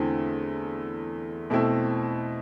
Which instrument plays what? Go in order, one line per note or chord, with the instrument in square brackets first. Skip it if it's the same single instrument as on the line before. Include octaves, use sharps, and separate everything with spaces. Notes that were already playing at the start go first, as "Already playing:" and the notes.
Already playing: [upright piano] E2 D3 A3 C4 E4
B2 A3 C4 E4